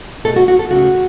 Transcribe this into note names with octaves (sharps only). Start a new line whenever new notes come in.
B2 A3 A4
F#4
F#4
A4
C#3 A3 F#4